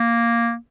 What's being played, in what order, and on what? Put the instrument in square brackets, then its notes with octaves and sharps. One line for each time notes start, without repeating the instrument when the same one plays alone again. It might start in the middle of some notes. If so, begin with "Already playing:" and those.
Already playing: [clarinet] A#3